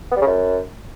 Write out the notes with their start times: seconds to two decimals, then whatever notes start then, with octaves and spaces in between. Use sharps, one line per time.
0.11 B3
0.17 G3
0.22 C#3
0.27 F#2